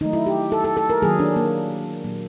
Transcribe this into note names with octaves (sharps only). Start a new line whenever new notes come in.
D#3 F#3 A3 D#4
E4
G4
A4
A4
A4
A#4
D#3 F#3 A#3 G#4
D4
A#3
A#2 F#3 A#3